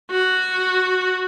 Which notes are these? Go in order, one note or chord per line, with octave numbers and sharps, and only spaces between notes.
F#4